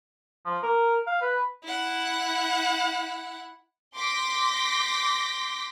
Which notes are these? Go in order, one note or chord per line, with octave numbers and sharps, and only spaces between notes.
F3
A#4
F5
B4
E4 F#5
C6 D6 G6 A#6 B6